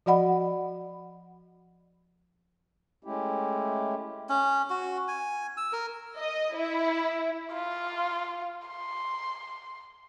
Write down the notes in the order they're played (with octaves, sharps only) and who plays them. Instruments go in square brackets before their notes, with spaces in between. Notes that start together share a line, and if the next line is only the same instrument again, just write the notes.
[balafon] F3 F#4 D5 D#5 F#5 B5
[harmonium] G#3 A3 C#4 E4 G4
[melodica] C#4
F#4
G#5
E6
A#4
[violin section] D#5
E4
[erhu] F4
C6